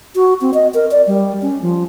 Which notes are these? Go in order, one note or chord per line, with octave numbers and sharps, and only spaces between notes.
F#4
C4
D#5
A#4
D5
G3
C#4
F3